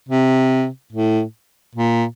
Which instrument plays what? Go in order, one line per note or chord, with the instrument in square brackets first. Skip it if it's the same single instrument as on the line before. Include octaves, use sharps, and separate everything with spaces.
[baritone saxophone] C3
A2
A#2